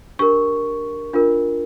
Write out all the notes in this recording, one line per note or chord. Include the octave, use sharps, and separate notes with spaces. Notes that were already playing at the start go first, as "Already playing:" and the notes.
D4 G4 A#4 C#6
D4 F4 A#4